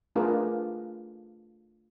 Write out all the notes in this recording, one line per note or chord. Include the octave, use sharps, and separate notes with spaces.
A3 D4 F4 G#4 A#4 B4